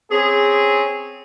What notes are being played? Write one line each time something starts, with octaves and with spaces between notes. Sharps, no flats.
C4 C#4 G#4